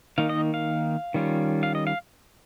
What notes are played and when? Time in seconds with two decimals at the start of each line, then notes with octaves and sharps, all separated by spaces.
0.18 D#3 A#3 D#4 F5
0.29 D#5
0.54 F5
1.14 D#3 G3 C#4 F4
1.63 F5
1.75 D#5
1.87 F5